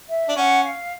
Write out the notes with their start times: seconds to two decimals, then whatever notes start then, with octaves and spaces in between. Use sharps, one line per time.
0.09 E5
0.29 D4
0.36 C#4 F#5
0.64 F5